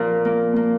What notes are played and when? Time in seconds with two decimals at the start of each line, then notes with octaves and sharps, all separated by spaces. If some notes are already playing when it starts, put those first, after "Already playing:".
Already playing: A#2 F3 A#4
0.25 A#3
0.56 A#3